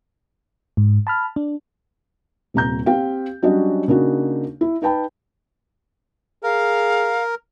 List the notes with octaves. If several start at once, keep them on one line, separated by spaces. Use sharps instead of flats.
G#2
A5 B5 F6
D4
D#1 C3 A#5 G6
C4 G4 F5 G5
F#3 G3 C#4 D4 F#4 D#5
C#3 A#3 D4 D#4 F#4
E4
D#4 B4 G5 A5 B5
G#4 A#4 F5